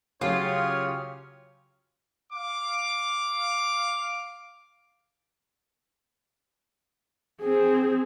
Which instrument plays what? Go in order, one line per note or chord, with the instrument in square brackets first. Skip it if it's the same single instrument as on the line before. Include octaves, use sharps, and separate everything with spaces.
[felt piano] C#3 F#3 [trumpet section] C#4 C#5 [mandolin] F4 [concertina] G4 D#6 F6
[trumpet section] F5 D6
[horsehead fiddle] C4 G#4